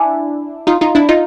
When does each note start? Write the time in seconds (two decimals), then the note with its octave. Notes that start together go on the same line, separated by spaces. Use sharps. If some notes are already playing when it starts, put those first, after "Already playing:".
Already playing: D4 E4 G#5
0.67 D#4 F4
0.81 D#4 F4
0.95 D4 E4
1.09 D#4 F4